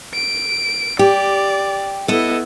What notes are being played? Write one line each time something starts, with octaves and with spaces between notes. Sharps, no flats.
D7
G4 D5
B3 E4 A4 D#5